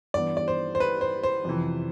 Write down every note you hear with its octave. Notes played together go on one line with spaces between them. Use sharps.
G2 E3 B3 D5
D5
C5
C5
B4
C5
C5
F2 C3 E3